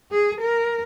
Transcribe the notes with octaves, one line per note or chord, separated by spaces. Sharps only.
G#4
A#4